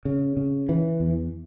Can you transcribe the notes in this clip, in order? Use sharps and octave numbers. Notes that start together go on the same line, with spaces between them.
C#3
C#3
E3
E2